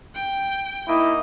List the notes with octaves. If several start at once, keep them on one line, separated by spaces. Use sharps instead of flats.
G5
A#3 D#4 E4 D#5